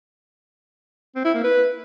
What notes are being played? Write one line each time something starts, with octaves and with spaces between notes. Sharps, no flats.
C4
E4
A#3
B4